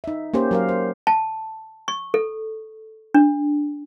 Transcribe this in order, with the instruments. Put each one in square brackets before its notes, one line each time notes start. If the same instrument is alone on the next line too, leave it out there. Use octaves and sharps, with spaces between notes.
[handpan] D#4 E5
A#3 C#4 G4 C5
F#3 A#4 F5
C5
[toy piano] A5
C#6
A4
D4